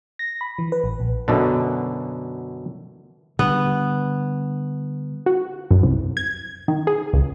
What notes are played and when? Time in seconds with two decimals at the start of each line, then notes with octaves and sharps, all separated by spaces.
0.19 A#6
0.41 B5
0.59 E3
0.72 B4
0.84 A1
1.00 A#1
1.28 F#2 B2 D3
3.39 D3 G3 B3
5.26 F#4
5.71 F#2
5.83 C2
6.17 G#6
6.68 D#3
6.87 G#4
7.13 C#2